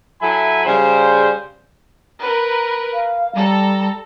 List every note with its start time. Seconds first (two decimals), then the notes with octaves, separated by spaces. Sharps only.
0.22 F#3 E4 A4 E5 G#5 B5
0.66 C#3 G3 C5
2.22 A#4 B4
2.94 F5
3.35 G3 A4 A#5